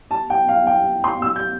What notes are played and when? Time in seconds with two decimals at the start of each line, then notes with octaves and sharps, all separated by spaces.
0.11 A5
0.30 G5
0.48 F5
0.67 G5
1.04 C6
1.22 E6
1.36 G6